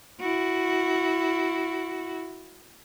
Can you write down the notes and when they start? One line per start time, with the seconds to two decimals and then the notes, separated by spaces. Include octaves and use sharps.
0.20 E4 F#4